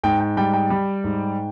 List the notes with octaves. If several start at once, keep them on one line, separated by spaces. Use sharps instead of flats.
G#2 G5
G5
G3 G5
G5
G3
G#2